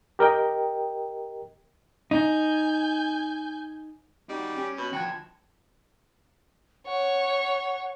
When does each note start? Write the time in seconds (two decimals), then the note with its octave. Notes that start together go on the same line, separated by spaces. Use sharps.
0.19 G4 A#4 D#5 G5
2.11 D#4 G#5 G6
4.29 G3 D#4 F#4
4.56 C#4 G4
4.78 B2 B5
4.93 D3 F3 F#4 G5 A5 G#6
6.87 C#5 F#5